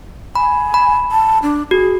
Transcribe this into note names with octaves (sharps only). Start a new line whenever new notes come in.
G#5 B5
B5
A5
D4
F#4 G#4